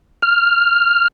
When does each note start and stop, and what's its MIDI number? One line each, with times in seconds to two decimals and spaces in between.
0.22 1.08 89